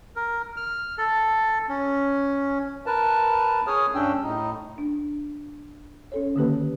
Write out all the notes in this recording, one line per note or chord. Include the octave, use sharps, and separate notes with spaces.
A#4
F6
A4
C#4
A#4 B4 A5
G#4 C#5 D#6 F6
G2 C#4 D4 G5 E6
A2 D#4
D4
C#4 A4 C#5
D3 D#3 A#3 G4 B4